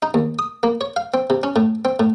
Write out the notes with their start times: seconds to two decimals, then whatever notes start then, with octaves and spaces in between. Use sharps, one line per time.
0.02 D#4
0.14 D#2
0.39 D#6
0.63 A#3
0.81 C#5
0.96 F5
1.14 C4
1.30 C3
1.43 C#4
1.56 A2
1.85 C4
1.99 A2